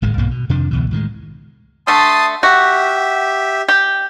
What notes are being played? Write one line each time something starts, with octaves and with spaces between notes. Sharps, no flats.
D1 G#1 A2 G#3
B1 G2 B2 A#3
B2
F2 C3 D#3 D4
C#2 B2 E3
A2 D#3 F3 G#3
D3 A3 A5 C6 D#6
F#4 G4 E5
G4